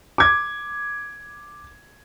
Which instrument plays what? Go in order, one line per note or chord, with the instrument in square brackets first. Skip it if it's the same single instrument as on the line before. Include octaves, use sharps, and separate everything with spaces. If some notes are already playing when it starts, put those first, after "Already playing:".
[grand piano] D6 G#6